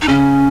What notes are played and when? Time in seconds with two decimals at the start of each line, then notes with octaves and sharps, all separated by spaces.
0.02 D#4
0.08 C#3 C#4